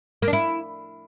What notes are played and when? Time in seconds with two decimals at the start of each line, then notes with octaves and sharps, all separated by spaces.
0.22 A#3
0.28 D4
0.33 E4